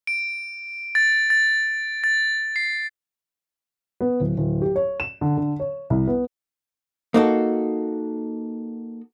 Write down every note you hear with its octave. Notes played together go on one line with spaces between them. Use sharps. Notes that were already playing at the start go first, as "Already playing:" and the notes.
D7
A6
A6
A6
C7
B3
D1
D1
G4
C#5
E7
D3
D3
C#5
C2
B3
A#3 D#4 F#4 A4